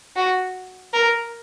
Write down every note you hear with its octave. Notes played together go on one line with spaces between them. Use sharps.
F#4
A#4